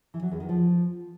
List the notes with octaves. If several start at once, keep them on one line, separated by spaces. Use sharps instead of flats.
E3
F#3
E2
D#3
F3